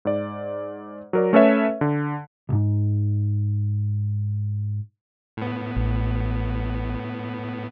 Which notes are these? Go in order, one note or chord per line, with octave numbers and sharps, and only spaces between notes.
G#2 D5
F#3 A#4 D5
A3 C#4 A4 B4 C#5 E5
D3
B1 G#2
A2 B3
A1